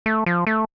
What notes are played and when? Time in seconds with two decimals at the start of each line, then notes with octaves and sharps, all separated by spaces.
0.06 A3
0.26 F3
0.47 A3